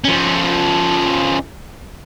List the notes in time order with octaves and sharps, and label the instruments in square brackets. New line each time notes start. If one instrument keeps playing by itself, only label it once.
[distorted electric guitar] F3 C#4